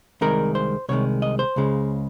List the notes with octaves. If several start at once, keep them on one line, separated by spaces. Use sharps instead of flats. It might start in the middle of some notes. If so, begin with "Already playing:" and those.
C2 C3 D#3 G#3 A#4
C5
C2 C3 D#3 G#3 C#5
D#5
C5
C#2 C#3 G#3